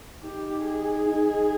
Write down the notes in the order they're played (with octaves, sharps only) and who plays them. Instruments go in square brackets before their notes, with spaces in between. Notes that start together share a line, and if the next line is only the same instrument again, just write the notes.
[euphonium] D#4 [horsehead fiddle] G4
[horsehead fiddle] G#4
[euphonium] D#4